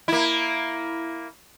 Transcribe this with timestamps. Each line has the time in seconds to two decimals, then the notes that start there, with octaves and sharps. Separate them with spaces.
0.08 A#3 E4